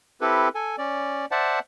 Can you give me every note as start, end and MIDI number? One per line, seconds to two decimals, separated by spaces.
0.21 0.48 60
0.21 0.48 64
0.21 0.48 67
0.21 0.48 69
0.21 0.48 71
0.55 0.76 69
0.55 0.76 80
0.78 1.26 61
0.78 1.26 74
1.31 1.59 72
1.31 1.59 74
1.31 1.59 76
1.31 1.59 78
1.31 1.59 81